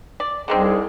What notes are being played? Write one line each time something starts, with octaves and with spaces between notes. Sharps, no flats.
D5
C2 D3 D#3 C4 G#4